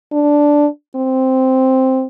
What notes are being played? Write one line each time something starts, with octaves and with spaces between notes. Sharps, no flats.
D4
C4